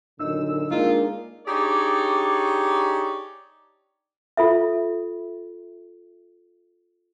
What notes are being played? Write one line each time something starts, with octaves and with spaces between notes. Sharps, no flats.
F#2 A#2 D3 D#3 D#4 E6
G#3 A#3 D4 D#4 F4 A#4
D4 D#4 G4 G#4 C#5 D5
F4 A4 E5